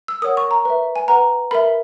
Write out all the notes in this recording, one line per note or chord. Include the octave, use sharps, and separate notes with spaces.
E6
A#4 C#5 F#5 D#6
C#6
A#5
B4 E5
G#5
B4 F#5 A#5
A#4 E5 B5